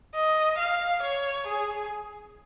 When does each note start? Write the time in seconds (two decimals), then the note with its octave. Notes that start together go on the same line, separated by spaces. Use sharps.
0.15 D#5
0.59 F5
1.02 C#5
1.47 G#4